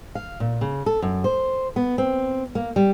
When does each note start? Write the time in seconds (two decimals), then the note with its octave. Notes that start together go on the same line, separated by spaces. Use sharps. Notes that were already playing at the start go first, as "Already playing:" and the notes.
0.15 F5
0.40 A#2
0.61 C#3
0.86 A4
1.02 F#2
1.24 C5
1.76 B3
1.98 C4
2.55 A#3
2.76 G3